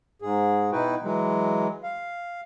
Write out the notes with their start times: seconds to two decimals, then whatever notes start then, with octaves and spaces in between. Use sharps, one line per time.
0.22 G#2 G#4
0.72 B2 D#4 E4 F#4 B4 G5
1.03 E3 F#3 G#3
1.83 F5